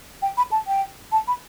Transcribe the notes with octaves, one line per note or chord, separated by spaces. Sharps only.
G5
B5
A5
G5
A5
B5